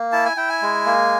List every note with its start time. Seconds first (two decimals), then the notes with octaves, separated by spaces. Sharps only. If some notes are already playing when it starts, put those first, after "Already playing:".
Already playing: A#3
0.12 E4 A5
0.25 G#5
0.37 E4 G5
0.49 G#5
0.62 G#3
0.86 A#3